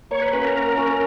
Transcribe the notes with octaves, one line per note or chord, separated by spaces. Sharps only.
A#3 C#5
B4
C#4 F#4 B4 C#5
A#4
A#3
C#4 F#4 C#5